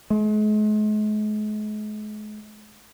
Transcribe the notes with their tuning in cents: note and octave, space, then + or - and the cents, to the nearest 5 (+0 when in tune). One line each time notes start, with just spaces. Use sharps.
G#3 +40